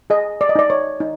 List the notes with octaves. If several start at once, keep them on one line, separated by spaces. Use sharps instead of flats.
G#4 D#5
D5
D#5
D#4 D5
C#5
D#4